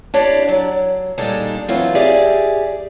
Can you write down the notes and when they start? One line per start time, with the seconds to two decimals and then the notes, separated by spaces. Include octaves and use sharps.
0.14 D4 E4 G4 C#5 D5
0.49 F#3
1.18 A#2 G3 G#3 D4 D#4 A4
1.68 E3 F#3 C4 F4
1.95 G4 G#4 D5 E5 G#5